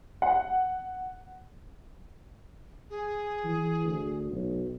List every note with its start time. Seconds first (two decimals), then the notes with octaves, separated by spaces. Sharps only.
0.22 F#5
2.90 G#4
3.44 E3
3.85 D2
4.31 B1